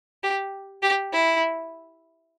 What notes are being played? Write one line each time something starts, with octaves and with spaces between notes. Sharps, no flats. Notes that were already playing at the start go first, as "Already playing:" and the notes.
G4
G4
E4